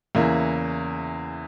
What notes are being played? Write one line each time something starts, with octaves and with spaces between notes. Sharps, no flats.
E2 C#3 E3 A#3 E4